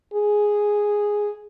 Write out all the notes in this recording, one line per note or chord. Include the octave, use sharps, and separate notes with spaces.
G#4